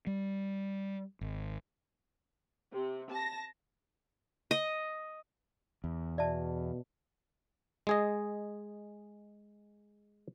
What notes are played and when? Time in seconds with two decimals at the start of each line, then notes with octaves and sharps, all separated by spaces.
0.07 G3
1.21 G#1
2.73 C3
3.12 A5 A#6
4.51 D#5
5.84 E2
6.18 B2 D5 E5 A5
7.87 G#3 G#4 D#5